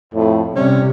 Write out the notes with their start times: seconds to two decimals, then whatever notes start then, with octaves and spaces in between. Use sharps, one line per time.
0.14 F2 A2
0.56 C3 G3 C#4